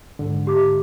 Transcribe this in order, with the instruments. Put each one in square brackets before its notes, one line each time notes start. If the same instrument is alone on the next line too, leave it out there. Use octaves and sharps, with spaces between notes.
[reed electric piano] G#2 D3
[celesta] G4 D6